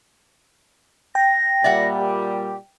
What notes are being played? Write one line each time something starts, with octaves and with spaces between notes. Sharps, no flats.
G5 A#6
A#2 G3 D5 E5 F#5
G4